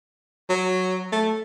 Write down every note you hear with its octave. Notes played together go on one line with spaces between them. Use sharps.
F#3
A3